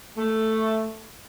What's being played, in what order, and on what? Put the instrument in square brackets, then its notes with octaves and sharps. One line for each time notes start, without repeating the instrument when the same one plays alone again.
[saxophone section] A3